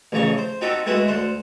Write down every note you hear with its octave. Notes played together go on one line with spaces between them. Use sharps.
A1 F2 C#3 A#5 C#6
C5
C4 D#4 F#4 G4 A4
G#3 A3 B3 E4 F#4
D2 C5 F#5